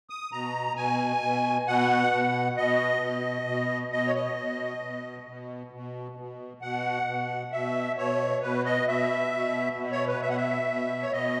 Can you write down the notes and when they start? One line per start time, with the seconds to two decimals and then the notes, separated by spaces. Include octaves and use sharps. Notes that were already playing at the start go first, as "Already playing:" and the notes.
0.10 D#6
0.32 B2 A#5
0.77 B2 G#5
1.22 B2
1.67 B2 F#5
2.12 B2
2.57 B2 D#5
3.02 B2
3.48 B2
3.92 B2 D#5
4.07 C#5
4.15 D#5
4.38 B2
4.82 B2
5.27 B2
5.72 B2
6.17 B2
6.62 B2 F#5
7.07 B2
7.52 B2 E5
7.97 B2 C#5
8.42 B2 B4
8.65 D#5
8.87 B2 E5
9.33 B2
9.77 B2
9.92 C#5
10.07 B4
10.22 B2 E5
10.29 F#5
10.37 E5
10.67 B2
11.02 C#5
11.12 B2 D#5